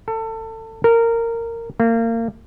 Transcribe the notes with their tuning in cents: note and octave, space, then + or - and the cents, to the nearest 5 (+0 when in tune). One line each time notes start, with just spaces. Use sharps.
A4 +25
A#4 -15
A#3 -30